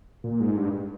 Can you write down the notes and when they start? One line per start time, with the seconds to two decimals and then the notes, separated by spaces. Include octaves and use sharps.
0.24 A#2
0.40 G#2
0.56 G2